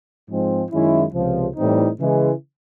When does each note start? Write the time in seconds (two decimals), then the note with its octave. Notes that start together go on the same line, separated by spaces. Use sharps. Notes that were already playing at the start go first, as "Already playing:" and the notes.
0.29 G#2 F3 G#3 C4
0.71 F#2 D#3 G#3 C#4 E4
1.14 C#2 C3 F3
1.56 A2 E3 G3 C4 D#4
1.99 C#3 E3 G#3